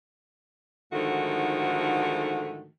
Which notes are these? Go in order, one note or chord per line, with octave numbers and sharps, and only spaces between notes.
G#2 D3 D#3 F3 A3 F#4